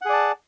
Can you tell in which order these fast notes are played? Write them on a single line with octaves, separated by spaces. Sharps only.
F#5 G#4 D5 A5